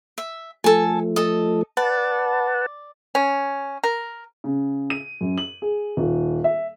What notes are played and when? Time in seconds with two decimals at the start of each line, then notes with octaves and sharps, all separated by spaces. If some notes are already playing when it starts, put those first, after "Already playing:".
0.18 E5
0.64 F3 A3 A4 G#5
1.16 A4 D#5
1.77 B4 D5 F#5 A5
3.15 C#4
3.84 A#4
4.44 C#3
4.90 D#7
5.21 F#2
5.38 F#7
5.62 G#4
5.97 D#1
6.44 E5